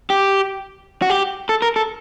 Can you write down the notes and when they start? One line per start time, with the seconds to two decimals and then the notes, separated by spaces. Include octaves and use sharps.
0.10 G4
1.02 F#4
1.10 G4
1.49 A4
1.62 A#4
1.76 A4